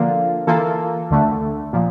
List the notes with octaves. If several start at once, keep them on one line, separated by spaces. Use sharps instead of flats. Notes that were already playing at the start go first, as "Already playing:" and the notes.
Already playing: D3 F3 A#3 F4
E3 A#3 F4 A4
D2 D3 A3
A#2 F3